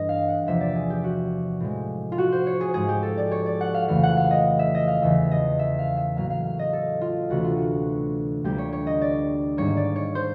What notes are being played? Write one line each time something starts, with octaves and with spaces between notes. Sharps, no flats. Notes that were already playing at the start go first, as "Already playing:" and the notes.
Already playing: G2 E3 A3 D#5
F5
F#5
E2 C3 F3 A#3 E5
D5
G#4
G4
F#4
A2 F3 G#3
F4
F#4
C5
C#5
G#4
G#2 F3 G#3 G#4
G4
A4
D5
C#5
D5
F#5
F5
F2 C#3 E3 A3 F5
F#5
F5
D#5
E5
D#5
F5
E2 C#3 E3 E5
D#5
E5
F5
E5
A2 F#3 A#3 F5
F5
F5
D#5
A4
F4
D2 C3 E3 A3 F#4
F4
F#4
D2 D3 G3 A#3 G4
C#5
C#5
D#5
D5
G#2 D#3 G3 A#3 C#5
D5
C#5
C5